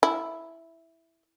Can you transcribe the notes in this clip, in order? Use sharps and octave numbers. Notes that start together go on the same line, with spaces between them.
E4